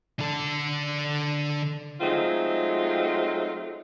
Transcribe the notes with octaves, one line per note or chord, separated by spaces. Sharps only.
D3 A4
F#3 G#3 A3 C4 D#4 F4